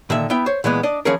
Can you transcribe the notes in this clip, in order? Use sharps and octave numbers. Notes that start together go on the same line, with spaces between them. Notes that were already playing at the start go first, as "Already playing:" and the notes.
A#2 D3 D#3 E5
B3 E4 E5 G5
C5 C#5
A#2 E3 G#3 B3
D4 D5 D#5
E3 F3 C#4 G#4 A#4